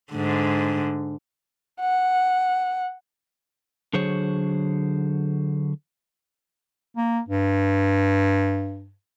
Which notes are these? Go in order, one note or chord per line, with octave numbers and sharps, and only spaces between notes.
G#2 D3
F#5
D3 F#3 G#4 C5 C#5
A#3
G2